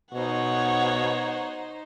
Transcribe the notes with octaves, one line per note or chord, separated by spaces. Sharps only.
B2 D#4 C5 C#5 F#5